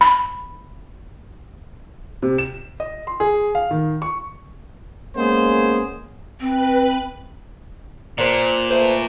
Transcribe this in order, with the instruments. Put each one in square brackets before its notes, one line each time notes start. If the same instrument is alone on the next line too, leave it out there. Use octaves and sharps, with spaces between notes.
[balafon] B5
[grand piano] C3
E7
D#5
C6
G#4
F5
D#3
C#6
[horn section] G#3 A#3 B3 C#4 G#4 C5
[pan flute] C4 [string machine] B4 F#6
[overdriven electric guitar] A#2 [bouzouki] D4 A#4 C5
[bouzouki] A3 B4 [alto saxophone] C5